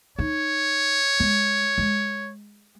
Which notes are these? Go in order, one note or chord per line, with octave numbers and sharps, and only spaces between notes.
D#4 C#5
G#3
G#3